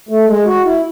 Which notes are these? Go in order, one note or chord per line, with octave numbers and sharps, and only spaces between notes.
A3
G#3
F#4
E4